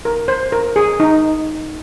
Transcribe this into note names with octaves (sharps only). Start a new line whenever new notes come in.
A#4
C5
A#4
G#4
D#4